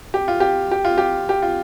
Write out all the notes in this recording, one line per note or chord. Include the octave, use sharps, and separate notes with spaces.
G4
F4
G4
G4
F4
G4
G4
F4